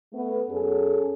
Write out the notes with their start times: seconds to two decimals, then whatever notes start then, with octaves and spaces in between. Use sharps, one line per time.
0.13 A3 B3
0.49 F#2 C#4 G#4 A4